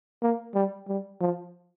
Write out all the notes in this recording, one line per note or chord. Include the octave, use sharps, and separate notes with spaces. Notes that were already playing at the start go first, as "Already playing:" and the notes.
A#3
G3
G3
F3